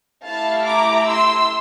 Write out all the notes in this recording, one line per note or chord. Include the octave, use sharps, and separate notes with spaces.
A3 E4 G4 F5 A5
A#5 D6
C6 E6